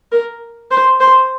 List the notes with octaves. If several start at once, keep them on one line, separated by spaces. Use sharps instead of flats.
A#4
C5
C5